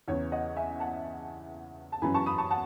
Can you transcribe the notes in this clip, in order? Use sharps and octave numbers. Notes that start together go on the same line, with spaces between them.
E2 C#3 E3 C#5
D#5 F#5
E5 G#5
F#5 A5
A5
F#2 E3 G#5 B5
A5 C#6
B5 D#6
A5 C#6
F#5 A5